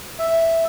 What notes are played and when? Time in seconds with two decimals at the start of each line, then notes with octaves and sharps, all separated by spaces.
0.19 E5